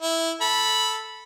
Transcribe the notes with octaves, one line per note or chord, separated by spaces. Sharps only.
E4
A4 B5